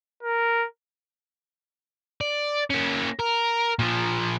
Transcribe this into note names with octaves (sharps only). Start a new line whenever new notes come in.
A#4
D5
A#3 C#4
A#4
A#2 F3